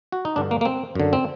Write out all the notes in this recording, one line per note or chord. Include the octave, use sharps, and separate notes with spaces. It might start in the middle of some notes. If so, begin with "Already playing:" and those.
F#4
D#4
G2 D3 D4
A#3
A#3
C4
F#2 D3
C4